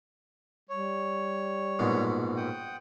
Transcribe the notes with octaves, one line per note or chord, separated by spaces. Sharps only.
G3 C#5
A#1 G#2 B2
F#5 G5 D#6